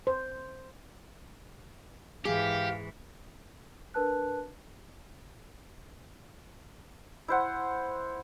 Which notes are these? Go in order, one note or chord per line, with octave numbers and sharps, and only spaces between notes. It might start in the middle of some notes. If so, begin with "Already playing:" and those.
C5
G#2 E3 G4 G#4 F5
D4 A#4 B4 A5 F#6
E4 C5 F#5